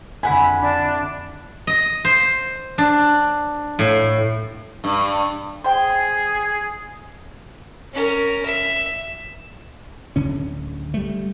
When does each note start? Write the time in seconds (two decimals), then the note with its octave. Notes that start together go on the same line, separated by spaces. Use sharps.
0.23 F2 D3 E4 F#5 G#5 B5
0.60 D4
1.67 D#5
2.04 C5
2.78 D4
3.79 A2
4.84 G2
5.64 G#4 C5 G5
7.94 C#4 A#4
8.45 E5
10.16 D1 D3 C#4
10.94 G3 A3